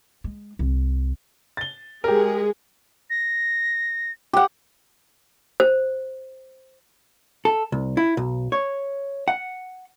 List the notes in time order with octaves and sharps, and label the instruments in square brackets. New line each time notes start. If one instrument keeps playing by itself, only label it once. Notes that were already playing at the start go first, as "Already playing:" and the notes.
[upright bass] G#3
C2
[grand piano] A6 G7
[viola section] G#3 G#4 [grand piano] G4 A#4
[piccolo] A#6
[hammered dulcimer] G4 F#5
[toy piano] C5
[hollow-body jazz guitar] A4
C2
E4
B1
C#5
F#5